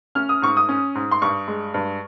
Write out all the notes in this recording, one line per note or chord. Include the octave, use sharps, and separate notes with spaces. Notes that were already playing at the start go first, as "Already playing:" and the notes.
C#4 F6
D#6
G#2 C#6
D#6
C#4
G#2
C6
G2 C#6
G#3
G2